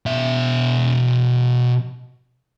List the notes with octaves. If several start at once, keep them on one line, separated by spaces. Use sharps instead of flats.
B2 E5